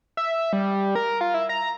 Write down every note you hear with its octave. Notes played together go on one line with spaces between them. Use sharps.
E5
G3
A#4
F4
E4
A#5